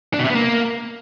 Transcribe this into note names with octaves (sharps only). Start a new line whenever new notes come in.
D4
B2
C3
B3
A#3